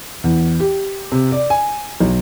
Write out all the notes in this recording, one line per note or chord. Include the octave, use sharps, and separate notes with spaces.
E2
G4
C3
D5
G#5
B1